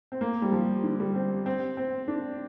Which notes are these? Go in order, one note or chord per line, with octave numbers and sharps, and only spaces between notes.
C4
A#3
G3
F3
D3
G3
C4
C4
C4
D4